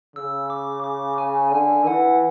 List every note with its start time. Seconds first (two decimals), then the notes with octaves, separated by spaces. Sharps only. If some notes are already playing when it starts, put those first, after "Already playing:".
0.16 C#3 E6
0.50 D6
0.84 D6
1.18 G#5
1.52 D3 G#5
1.86 E3 F#5